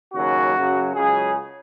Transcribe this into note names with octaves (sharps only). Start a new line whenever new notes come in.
D#2 C#3 F#3 F#4
F#2 C#3 F#3
C#2 C#3 F#3 G#4